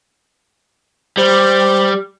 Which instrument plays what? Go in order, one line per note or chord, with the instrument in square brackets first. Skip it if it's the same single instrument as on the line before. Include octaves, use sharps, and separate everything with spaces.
[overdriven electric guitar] G3 [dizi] C5